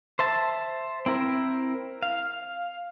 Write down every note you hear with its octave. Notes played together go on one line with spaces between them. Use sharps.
C5 E5 A5
C4 E4 A#4 E5
F5